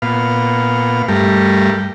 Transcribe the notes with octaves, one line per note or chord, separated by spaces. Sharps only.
A#2 B3 F5
G2 G3 A3 A#4